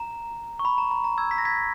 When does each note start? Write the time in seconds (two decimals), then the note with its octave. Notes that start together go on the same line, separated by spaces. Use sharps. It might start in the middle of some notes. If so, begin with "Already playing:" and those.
Already playing: A#5
0.59 C#6
0.65 B5
0.78 A#5
0.91 A#5
1.04 A#5
1.18 E6 G#6
1.31 B6
1.38 A#6
1.45 G#6 B6